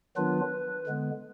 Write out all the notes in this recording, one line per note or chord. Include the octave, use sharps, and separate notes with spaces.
D#3 F#3 B3 D4 F4 B4
D3 G#3 B3